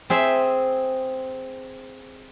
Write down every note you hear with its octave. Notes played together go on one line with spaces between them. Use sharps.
C4 G#4 E5